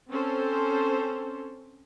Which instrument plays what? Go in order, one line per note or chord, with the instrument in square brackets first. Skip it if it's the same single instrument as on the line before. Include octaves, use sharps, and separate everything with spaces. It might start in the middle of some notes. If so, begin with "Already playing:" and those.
[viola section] C4 C#4 A4 C5